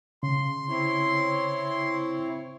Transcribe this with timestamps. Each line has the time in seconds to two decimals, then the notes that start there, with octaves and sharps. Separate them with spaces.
0.23 C#3 C6
0.68 C4 E4 C#5